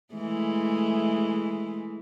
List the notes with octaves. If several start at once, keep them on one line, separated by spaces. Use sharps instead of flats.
E3 G#3 A3